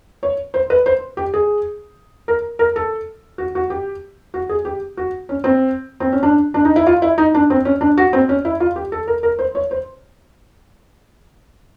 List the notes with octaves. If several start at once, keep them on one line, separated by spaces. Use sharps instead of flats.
C#5
C5
B4
C5
G4
G#4
A#4
A#4
A4
F#4
F#4
G4
F#4
G#4
G4
F#4
C#4
C4
C4
C#4
D4
D4
D#4
E4
F4
E4
D#4
D4
C4
C#4
D4
F#4
C4
C#4
E4
F4
G4
A4
A#4
A#4
C5
C#5
C5